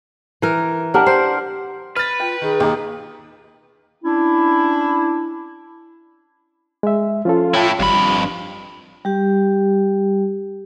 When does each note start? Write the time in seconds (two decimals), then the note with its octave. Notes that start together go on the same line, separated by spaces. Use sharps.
0.42 E3 A#4
0.94 D4 G4 A#4 F#5
1.06 C5
1.97 B4 F6 A6
2.20 F4 G5
2.42 D#3 G#4
2.60 D#2 D#4 G4
4.03 C#4 D4 E4
6.83 G#3 E5
7.25 F3 C#4 F4 A4
7.54 A3 E4 C#5 G5 A5
7.79 G#1 F2 G3 B5
7.94 G2
9.05 G3 G4